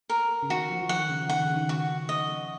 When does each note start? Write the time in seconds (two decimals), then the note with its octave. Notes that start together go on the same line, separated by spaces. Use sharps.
0.09 A#4
0.43 C#3
0.50 D#3 F#4
0.70 F3
0.81 F3
0.89 D#3 F#5
1.09 C#3
1.29 D#3 F#5
1.43 C#3
1.57 D#3
1.69 F#4
2.09 D#5